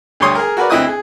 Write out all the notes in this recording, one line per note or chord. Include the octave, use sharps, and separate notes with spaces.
D2 G3 G4 C#5 C6 D#6
G#4 A#4
F#4 A#4 B4 D5
D2 C4 E4 D#5 D#6 F#6
G#4